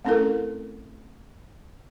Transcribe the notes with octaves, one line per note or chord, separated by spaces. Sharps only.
A3 C4 C#4 E4 A4 A#4